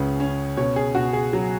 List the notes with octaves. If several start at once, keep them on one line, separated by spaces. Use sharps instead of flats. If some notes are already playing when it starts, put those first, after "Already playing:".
Already playing: C#2 C#4 G#4 B4
C#4
B2 C#5
G#4
B2 F#4
G#4
F#3